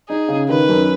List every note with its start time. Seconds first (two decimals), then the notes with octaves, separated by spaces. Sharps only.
0.09 D#4 G#4
0.29 C#3
0.49 D#3 B4
0.69 F#2